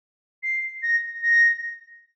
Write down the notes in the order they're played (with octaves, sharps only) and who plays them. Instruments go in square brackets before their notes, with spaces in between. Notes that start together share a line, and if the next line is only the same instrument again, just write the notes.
[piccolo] C7
A#6
A#6